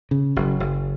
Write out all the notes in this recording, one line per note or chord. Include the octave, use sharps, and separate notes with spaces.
C#3
F#1
F#1